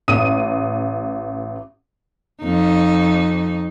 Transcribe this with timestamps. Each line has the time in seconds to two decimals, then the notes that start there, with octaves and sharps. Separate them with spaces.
0.08 A1 D#6 D#7
2.43 F2 D#4